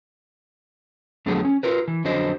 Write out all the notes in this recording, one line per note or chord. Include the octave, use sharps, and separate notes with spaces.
F2 D3 F#3 A3 B3 G#4
C#4
F4 A#4 B4
E3
F2 D3 F#3 C5 D#5